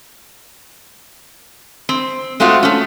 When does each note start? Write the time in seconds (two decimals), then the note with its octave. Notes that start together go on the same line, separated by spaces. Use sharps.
1.89 C4
2.40 G#3 A3 C4 F4 F#4
2.63 A3 C#4